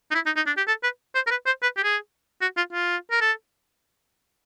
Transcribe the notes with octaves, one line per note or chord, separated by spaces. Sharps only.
D#4
E4
D#4
D#4
D4
G4
A4
B4
C5
A#4
B4
C5
B4
G4
G#4
F#4
F4
F4
A#4
A4